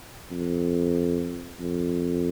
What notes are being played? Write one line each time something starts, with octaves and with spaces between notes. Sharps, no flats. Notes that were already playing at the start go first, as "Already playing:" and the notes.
F2
F2